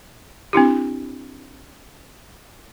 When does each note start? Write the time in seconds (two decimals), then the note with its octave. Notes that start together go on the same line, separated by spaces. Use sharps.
0.53 C4 D4 E4 G4